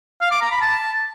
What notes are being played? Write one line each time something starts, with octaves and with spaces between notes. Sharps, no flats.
F5
D6
A#5
B5
A5